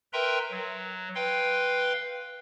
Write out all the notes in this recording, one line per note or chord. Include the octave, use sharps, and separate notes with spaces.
A#4 B4 E5 G5 A#5 C6
F#3
B4 F5 G5 C6